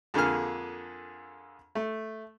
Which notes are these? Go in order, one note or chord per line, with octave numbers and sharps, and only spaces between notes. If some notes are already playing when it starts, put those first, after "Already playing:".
F2 D3 A#3 G#4 F6
A3